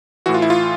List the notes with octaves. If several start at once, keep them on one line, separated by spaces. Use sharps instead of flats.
A2 E3 F#4
F4
E4
F4